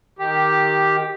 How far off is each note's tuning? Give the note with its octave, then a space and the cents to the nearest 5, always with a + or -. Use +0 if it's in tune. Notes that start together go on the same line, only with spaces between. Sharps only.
D#3 +0 G4 +0